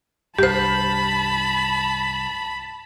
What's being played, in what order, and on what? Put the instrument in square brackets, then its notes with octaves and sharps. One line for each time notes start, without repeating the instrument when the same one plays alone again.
[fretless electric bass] C2 G2 [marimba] G4 C5 [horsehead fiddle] A5 [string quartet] B5